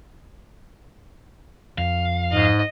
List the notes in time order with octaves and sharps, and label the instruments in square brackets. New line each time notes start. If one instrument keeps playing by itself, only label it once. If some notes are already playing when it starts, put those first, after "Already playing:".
[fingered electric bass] F2 [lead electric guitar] F5
[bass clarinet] G#2 [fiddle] D#5